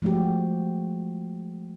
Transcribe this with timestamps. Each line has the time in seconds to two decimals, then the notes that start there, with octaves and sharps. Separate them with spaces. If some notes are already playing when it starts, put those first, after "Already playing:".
0.02 F3 G#3 A3 F#4 G4